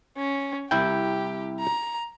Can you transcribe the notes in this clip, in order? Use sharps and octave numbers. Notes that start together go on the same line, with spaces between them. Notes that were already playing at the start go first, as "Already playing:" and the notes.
C#4
C2 E4 G4 G5
A#5